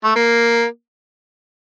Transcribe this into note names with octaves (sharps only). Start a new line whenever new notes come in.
A3
A#3